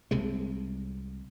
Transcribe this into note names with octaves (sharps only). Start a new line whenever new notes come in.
C2 C3 G#3